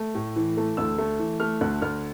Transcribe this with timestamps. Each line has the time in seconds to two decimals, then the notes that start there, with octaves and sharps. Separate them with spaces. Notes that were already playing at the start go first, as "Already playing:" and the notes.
Already playing: A3
0.15 A2
0.36 E3
0.57 A3
0.77 D2 E6
0.98 A3
1.19 E3
1.40 A3 F6
1.61 D2 F#6
1.82 D2 F6